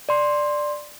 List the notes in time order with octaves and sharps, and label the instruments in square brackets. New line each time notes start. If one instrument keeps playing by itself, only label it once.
[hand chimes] D5 C6